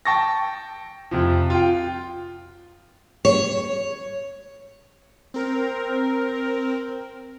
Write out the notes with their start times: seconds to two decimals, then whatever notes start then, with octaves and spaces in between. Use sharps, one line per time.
0.05 G5 A5 C#6 A6 A#6
1.11 F2 C3 F3
1.50 F4 G5
3.25 C#5
5.34 C4 A#4